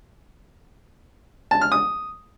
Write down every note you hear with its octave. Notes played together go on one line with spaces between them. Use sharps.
A5
F6
D#6